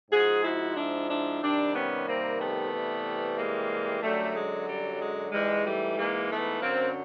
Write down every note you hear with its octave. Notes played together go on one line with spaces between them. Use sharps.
G#2 F3 F#4 G#4
E4 F#4
D4 E4
D4 E4
C3 D#3 G3 C4 D4
B3 C#4
A#3 C4
A3 B3
C3 E3 G3
G#3 A#3
F#2 D3 F#3 G3 A3
G#3
G3
G#3
G#2 E3 G3 G#3
G3 A3
G#3 A#3
A3 B3
F#2 D3 F#3 A#3 C4